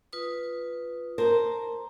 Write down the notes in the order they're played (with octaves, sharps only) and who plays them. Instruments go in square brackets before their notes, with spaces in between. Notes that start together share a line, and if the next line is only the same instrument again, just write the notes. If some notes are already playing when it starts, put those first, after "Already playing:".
[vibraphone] F4 B4 D#6
[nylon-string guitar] A#4 C5 [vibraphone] A5 A#5